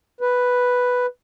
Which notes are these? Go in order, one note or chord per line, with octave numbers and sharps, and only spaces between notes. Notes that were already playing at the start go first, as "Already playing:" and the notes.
B4